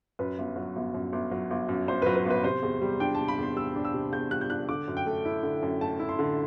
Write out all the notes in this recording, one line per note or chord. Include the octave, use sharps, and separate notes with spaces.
F#2 B4
G1
F#3
G1
F#2
G1
F#3
G1
F#2
G1 C5
B4
F#3
B4
G1 B4
C3 C5
E2
G3
D4 G5
A5
C3
B5
E2 C6
G3 E6
D4
E6
C3
E2 G6
G3 F#6
G6
D4 F#6
D3 D6
F#2
G5
A3
E4
D3
F#2
A3 A5
E4
C6
D3